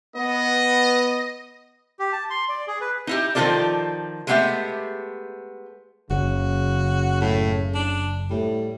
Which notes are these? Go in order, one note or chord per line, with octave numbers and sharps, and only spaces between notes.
B3 D#5
G4
A5
C6
D5
G#4
B4
D#4 E4 G4
D#3 F3 B3 F4 A4 D5
G#3 A3 B3 D4 G4 E5
F#1 C#3 F#4
A2
D4
A2 G3